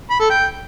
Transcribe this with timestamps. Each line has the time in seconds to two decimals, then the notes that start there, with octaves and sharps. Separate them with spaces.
0.11 B5
0.21 A4
0.30 G5